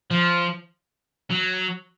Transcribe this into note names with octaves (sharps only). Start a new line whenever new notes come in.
F3
F#3